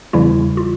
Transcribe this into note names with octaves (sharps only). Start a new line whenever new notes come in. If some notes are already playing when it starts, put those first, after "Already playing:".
E2 C#3 E3 G3 E4
F4